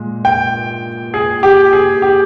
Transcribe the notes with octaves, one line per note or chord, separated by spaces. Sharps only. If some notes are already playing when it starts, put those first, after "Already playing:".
Already playing: A#2 G#3
G5
G#4
G4
G#4
G4